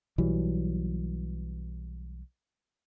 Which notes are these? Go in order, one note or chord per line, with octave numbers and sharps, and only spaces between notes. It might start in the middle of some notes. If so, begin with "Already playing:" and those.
B1 E3 F#3 G3